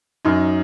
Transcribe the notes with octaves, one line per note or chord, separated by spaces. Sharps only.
F#2 D#4